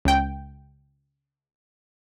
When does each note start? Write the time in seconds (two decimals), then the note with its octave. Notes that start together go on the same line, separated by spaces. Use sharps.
0.05 C#2 G5